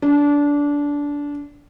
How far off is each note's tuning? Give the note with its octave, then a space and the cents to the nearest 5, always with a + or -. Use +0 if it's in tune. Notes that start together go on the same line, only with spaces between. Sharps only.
D4 -20